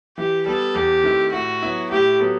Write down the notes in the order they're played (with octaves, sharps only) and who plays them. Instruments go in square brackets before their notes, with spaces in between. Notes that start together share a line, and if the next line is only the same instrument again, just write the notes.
[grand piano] E3 [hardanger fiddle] G4
[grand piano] G3 B3 [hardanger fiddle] A4
[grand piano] E2 [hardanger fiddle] G4
[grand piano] D#3 A3 C4 E4
[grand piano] A2 [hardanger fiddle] F#4
[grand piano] F#3 B3 E4
[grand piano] A2 [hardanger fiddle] G4
[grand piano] F#3 B3 F#4 A4